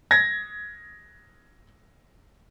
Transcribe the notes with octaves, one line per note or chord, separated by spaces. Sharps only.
G#6 A#6